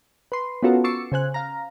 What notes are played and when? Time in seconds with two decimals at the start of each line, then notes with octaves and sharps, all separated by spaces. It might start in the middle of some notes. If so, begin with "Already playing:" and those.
0.32 B4 C6
0.63 B3 C#4 F4 F#4 A4 A#4
0.84 C#6 D6 E6 A6 C7 C#7
1.12 C#3 C5 G#5 F#6
1.34 F5 A#5